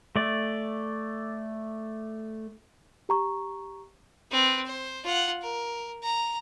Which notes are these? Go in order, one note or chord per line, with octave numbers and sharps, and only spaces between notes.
A3 D5
G4 A#5 C#6
C4 B4
C5
F4 F#5
A#4
A#5